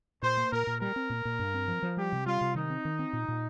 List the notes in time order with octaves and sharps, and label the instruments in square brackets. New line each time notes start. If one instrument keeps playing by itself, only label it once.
[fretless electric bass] A#2 [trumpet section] C5
[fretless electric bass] A#3
[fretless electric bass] A#2 [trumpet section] A#4
[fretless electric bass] A#2
[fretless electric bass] G3 [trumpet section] A#4
[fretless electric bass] C4
A#2
A#2
G2
C4
F3
F3
[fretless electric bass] G3 [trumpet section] G4
[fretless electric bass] C3
[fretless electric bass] G3 [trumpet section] F4
[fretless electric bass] C3
[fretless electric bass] D#3 [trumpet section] D#4
[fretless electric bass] C4
D#3
C4
A#2
A#2